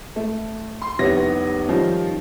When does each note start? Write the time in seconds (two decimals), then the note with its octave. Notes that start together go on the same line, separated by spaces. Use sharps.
0.16 A3
0.82 C6
0.99 F1 C2 B3 C#5 A#6
1.68 D#3 F3 G3 C#4